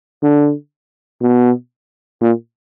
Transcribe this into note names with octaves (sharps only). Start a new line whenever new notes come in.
D3
B2
A#2